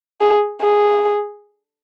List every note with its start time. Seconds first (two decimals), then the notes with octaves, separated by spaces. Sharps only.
0.21 G#4
0.61 G#4